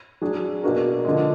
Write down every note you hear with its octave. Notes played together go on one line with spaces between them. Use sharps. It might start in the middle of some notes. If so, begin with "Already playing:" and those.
F#3 D4 G#4
B2 A#3 D4 F#4 A#4
D3 F3 G#3